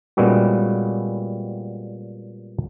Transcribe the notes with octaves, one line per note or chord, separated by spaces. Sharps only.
A#2 G3 G#3 B3 C#4 F#4